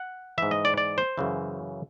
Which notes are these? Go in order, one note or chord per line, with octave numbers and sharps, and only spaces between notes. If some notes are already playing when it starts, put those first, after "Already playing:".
Already playing: F#5
G#2 E3 E5
D#5
D5
D5
C5
F#2 C#3 E3